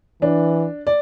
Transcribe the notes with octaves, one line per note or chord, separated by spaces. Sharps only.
E3 D4
D5